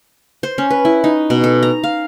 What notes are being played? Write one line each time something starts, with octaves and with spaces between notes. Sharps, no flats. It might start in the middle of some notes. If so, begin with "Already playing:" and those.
C5
C#4
B4
E4
D#4
B2
A4
A#5
F5